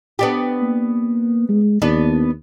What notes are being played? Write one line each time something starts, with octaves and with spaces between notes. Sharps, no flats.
B3 D4 G4
A#3
G#3
D#2 B3 D4